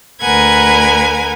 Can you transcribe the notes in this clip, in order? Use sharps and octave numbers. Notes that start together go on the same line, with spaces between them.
D2 A#4 B4 F#5 G#5 G#6